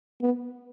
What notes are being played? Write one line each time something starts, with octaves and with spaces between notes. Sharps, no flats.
B3